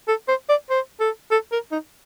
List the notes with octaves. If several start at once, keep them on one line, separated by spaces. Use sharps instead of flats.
A4
C5
D5
C5
A4
A4
A#4
D#4